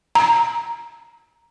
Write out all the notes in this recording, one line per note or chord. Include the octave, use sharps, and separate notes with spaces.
A#5